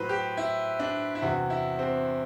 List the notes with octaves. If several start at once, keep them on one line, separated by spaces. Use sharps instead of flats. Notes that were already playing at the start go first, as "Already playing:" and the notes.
Already playing: A2 F#3 B4 C5
G4
E4
D4
E4
E2 C3 E3 F#4
E4
C4